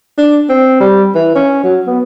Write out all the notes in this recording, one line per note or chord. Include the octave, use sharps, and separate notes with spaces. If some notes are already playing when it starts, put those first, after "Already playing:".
D4
C4
G3
E3
C#4
F#3
B3